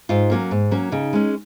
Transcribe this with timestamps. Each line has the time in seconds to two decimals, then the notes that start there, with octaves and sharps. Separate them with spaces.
0.09 G#2 F4
0.30 F#3 A#3 C#4
0.51 G#2
0.71 F#3 A#3 C#4
0.92 C#3 D#4
1.13 G#3 C#4